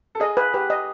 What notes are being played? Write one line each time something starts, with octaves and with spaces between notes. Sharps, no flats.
A4
G#4 D#5
B4
G4 B4
D#5